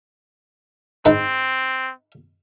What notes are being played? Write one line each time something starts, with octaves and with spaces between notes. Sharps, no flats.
G#2 C4 D#4 B4